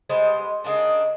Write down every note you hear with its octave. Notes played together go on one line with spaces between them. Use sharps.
G3 G#3 B3 C5
C#3 G#3 A#3 D4